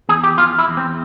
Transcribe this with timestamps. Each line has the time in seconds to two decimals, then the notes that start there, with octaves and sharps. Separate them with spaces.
0.09 E2 G#4
0.24 G4
0.38 E2 F4
0.58 E4
0.68 E2
0.77 C4